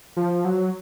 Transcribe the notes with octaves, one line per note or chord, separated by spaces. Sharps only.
F3
F#3